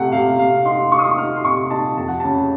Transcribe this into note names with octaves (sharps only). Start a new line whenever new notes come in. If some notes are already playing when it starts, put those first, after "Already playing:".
Already playing: C3 A3 F#5
C3 F5
C3 F5
D#4 C6
D#4 C#6
D#6
C#6
D#4 F6
C6
C3 C#6
D#4 A5
F2 A5
F#5
C#3 A5